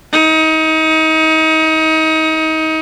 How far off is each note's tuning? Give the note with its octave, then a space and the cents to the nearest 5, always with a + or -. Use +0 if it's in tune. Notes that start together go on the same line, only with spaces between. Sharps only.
D#4 +30